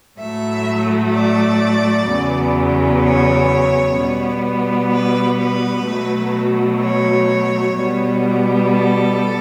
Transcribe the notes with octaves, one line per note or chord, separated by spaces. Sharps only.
A2 F#3 A3 E5
D5
E2 C#3 F#3 B3
C#5
B2 G3 B3
B4
B4
B2 F#3 A3
C#5
B2 G3 B3
A4